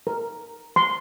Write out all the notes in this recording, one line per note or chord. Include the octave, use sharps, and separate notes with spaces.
A#4
C6